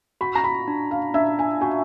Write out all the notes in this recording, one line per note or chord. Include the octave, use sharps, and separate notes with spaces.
F#4 B5
A#5
B5
D4
F5
D4 E5
G#5
F#4 G#5